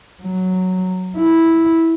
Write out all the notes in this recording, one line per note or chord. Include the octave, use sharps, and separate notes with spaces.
F#3
E4